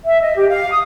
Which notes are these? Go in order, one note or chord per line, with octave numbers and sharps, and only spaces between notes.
E5
D#5
G4
F5
D#6